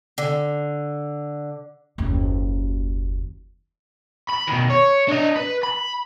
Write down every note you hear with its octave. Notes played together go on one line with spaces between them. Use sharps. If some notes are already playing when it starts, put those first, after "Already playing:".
D3
F#1 D#2
B5
B2 D#3
C#5
D4 D#5
B4
B5